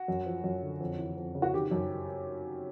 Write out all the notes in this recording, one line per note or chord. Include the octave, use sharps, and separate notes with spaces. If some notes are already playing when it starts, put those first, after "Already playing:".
Already playing: F#4
F#2
F3
F#2
D3
F2
E3
F2
C#3
F#4
D#3 G4
F#2